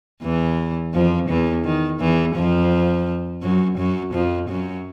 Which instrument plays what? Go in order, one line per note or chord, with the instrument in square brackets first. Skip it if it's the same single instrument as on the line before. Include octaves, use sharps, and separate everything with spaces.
[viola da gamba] E2 E3
F2 F3
E2 E3
D#3
E2 E3
F2 F3
F#2 F#3
F#2 F#3
F2 F3
F#2 F#3